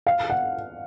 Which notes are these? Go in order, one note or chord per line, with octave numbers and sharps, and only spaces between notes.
F5
F#5